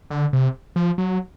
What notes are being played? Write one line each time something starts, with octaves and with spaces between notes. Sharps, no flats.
D3
C3
F3
F#3